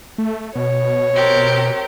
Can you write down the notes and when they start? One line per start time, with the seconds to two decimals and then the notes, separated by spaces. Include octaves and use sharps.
0.18 A3
0.55 B2 C#5
1.13 C4 G4 A#4